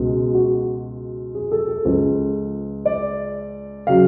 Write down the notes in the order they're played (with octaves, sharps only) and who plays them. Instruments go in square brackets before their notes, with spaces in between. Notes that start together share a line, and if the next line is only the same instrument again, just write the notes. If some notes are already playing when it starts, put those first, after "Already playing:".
Already playing: [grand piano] C#2 B2 G#3
F#4
G#4
A4
A4
C#2 C#3 F3 B4
D5
C#3 F#3 F5